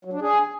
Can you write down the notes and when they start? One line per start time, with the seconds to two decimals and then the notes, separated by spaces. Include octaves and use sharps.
0.05 F#3
0.13 D4
0.22 G#4